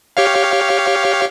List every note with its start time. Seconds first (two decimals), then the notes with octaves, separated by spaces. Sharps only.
0.17 G4 C#5 F5